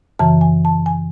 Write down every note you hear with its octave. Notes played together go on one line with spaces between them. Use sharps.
F#2 C#3 E3 A5
G#5
A5
G#5